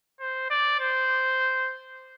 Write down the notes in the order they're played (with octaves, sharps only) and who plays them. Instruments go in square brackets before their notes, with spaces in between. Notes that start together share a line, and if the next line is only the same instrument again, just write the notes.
[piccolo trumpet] C5
D5
C5